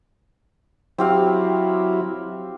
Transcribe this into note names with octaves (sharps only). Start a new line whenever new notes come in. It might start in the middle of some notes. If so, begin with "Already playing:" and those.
F#3 C4 E4 G4 F5